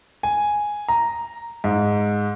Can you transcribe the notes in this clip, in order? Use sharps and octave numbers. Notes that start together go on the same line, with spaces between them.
G#5
A#5
G#2